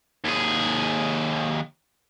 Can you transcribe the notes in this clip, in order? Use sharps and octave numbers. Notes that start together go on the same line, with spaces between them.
D#2 G#4